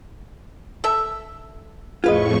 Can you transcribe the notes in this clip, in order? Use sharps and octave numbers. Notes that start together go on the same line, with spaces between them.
A4 E5
F2 A2 F4 G#4 B4 D#5 C#6